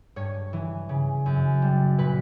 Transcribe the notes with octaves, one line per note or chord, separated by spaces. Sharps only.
G2 C#5
E3
C#3
F#2
G3
A#2 B4